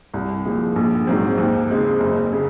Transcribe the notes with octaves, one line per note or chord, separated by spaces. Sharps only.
C2
A#2 F3 G#3
A#1
G#2 F#3 C4
D#2
C#3 G#3 C4
F#1
C#3